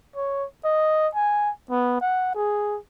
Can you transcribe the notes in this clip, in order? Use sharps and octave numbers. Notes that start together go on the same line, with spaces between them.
C#5
D#5
G#5
B3
F#5
G#4